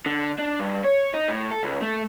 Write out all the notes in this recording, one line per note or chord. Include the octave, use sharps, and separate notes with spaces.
D3
D4
G2
C#5
D#4
A2
A4
C#2
A3